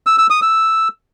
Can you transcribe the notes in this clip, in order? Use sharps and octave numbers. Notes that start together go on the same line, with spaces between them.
E6
E6
D#6
E6